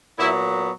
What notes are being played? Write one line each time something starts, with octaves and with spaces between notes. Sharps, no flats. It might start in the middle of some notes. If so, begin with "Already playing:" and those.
A#2 F#3 B3 E4